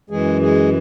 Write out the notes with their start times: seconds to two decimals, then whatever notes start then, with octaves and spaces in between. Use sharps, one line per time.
0.10 F#2 E3 G#3 G#4
0.41 G#3 G#4